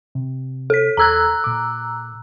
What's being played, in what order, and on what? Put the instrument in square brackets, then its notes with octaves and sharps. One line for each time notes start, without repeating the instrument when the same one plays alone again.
[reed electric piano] C3
[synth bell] A4 B6
[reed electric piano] E2 A4 G#6 [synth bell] A#5 E6 F#6
[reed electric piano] A#2 D6